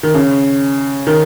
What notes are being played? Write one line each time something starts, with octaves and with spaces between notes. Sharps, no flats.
D#3
C#3
D#3